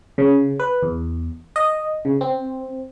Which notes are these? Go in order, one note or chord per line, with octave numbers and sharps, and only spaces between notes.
C#3
B4
E2
D#5
C#3
C4